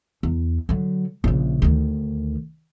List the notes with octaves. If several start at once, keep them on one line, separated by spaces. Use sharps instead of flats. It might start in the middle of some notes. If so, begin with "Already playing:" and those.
E2
D3 F#3
A#1 C#3
D2 D#3